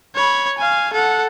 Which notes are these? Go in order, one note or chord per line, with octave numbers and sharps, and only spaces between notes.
C#5 B5
F5 G#5
A4 F#5